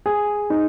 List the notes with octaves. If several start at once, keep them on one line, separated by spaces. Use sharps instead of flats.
G#4
D#4